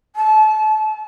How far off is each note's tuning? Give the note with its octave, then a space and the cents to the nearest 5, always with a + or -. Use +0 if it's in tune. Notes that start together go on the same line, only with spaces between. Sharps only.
A5 -35